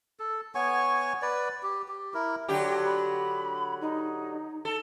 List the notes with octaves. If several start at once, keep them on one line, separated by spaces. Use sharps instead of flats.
A4
B3 C#5 G#5 C#6
B4 D5
G4
G4
E4 A#4
D3 F#3 G4 G5
B5
D#4
A4